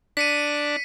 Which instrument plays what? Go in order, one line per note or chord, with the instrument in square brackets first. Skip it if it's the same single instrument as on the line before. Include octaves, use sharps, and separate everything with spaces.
[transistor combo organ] D4 [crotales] B6 C#7 D#7